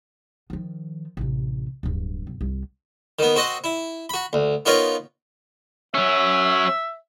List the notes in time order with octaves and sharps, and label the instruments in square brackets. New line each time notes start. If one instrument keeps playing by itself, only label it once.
[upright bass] D#3 F3
A1 C3
D1 G2
B1
C2
[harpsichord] D#3 B3
C4 F#4 D#5 F#5
E4
F#4 B5
D2
B3 D#4 F4 A#4 B4 C#5
[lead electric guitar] F#3 C#4 [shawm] E5